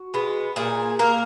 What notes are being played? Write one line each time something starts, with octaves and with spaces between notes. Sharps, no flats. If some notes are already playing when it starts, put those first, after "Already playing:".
Already playing: F#4
G#3 B3
A#2 G#4
A#3 A#4